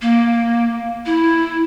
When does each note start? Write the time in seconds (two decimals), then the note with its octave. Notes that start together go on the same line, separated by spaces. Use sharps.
0.02 A#3
1.06 E4